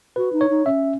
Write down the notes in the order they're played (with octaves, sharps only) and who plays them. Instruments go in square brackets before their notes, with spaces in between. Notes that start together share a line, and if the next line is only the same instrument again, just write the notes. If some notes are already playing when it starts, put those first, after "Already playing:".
[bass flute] F#4 [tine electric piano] B4
[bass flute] D#4
[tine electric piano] C#5
[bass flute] D#4
[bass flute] C#4 [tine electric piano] E5